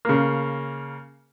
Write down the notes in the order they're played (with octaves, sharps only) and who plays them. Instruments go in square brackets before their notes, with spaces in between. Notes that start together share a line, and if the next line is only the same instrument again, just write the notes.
[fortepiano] C#3 A#3